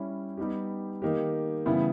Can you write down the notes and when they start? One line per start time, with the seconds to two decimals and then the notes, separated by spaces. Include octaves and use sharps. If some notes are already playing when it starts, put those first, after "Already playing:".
Already playing: G3 C#4 E4
0.37 G3 B3 D#4 G4
1.02 D#3 A#3 D#4 G4
1.66 C#3 E3 G3 B3 E4